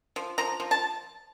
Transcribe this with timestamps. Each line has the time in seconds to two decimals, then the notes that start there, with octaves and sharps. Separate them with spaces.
0.16 F3
0.38 F3 A#5
0.60 F3
0.71 A5